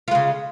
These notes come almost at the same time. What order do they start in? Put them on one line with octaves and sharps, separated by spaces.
F4 G#3 C#3